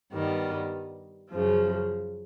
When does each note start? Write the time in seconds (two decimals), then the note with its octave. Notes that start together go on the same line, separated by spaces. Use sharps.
0.12 G2 D#3 G3 B3
1.30 F#2 C#3 F3